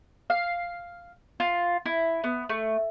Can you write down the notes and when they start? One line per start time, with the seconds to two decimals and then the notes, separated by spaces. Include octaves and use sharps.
0.30 F5
1.40 F4
1.86 E4
2.24 B3
2.49 A3